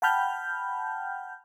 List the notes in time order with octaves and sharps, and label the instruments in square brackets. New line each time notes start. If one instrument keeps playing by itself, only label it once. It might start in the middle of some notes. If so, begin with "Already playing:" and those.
[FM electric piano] F#5 G5 A5 B5 F6 G6